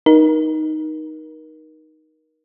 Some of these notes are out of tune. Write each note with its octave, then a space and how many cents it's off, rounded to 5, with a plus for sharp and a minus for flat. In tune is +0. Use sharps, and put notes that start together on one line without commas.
D#4 +0 A#4 +30